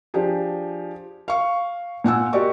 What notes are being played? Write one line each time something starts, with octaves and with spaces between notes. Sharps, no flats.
F3 D4 G4 G#4
F5 C#6
A#2 F#5 G#5 E6
F#4 G4 A#4 D5 D#5 C#6